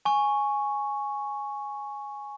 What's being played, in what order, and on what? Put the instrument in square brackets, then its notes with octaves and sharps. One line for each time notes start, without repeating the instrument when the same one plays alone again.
[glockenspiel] G#5 C#6